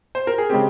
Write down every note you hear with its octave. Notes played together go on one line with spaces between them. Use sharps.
C5
A#4
G#4
C#3 G#3 C4 G4